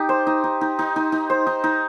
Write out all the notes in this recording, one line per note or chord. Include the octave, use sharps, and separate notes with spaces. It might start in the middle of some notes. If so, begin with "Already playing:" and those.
Already playing: D#4 G4
C5
D#4
D#4
D#4
D#4
D#4
D#4
C5
D#4
D#4